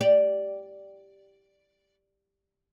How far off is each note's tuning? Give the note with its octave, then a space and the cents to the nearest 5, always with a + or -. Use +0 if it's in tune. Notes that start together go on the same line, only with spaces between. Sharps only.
G4 +0 D5 +0